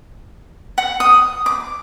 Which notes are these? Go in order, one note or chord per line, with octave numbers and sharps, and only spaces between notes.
F#5
D#6
D6